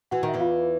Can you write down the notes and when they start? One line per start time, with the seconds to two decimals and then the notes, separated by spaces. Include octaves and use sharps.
0.11 E3 F#4 F#5
0.23 D#3
0.28 E5
0.33 E2 E3
0.40 F4 F5